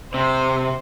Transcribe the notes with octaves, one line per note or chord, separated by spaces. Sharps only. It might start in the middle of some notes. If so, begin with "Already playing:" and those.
C3 C5